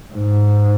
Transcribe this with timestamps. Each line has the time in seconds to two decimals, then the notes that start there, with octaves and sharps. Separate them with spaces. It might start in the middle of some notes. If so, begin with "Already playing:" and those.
0.13 G#2